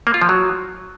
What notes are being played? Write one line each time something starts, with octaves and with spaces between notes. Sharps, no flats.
A#3
F4
F3
F#3